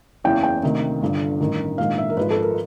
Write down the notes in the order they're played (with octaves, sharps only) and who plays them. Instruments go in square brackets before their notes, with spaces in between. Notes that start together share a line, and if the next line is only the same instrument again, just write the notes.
[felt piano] F#1 E2 C#3 E3 G5
G5
D2 C3 D#3
G1 G2 D3
A1 G2 D#3
A#1 G#2 D#3 F5
E5
A#4
G#1 G#2 F3 B4
A4
A#4